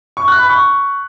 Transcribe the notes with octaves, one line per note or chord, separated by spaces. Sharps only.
C#6
F#6
B5
C#6